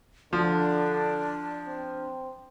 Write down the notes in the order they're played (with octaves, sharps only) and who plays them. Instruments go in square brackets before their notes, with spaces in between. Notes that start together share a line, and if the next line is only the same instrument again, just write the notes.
[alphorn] D3 [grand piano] F3 [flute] D4
[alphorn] C4